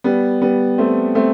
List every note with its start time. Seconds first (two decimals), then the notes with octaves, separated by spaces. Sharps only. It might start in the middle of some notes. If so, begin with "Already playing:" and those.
0.04 G3 B3
0.42 G3 B3
0.78 A3 C4
1.15 A3 C4